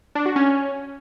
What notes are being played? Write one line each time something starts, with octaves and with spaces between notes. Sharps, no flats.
D4
F#4
C#4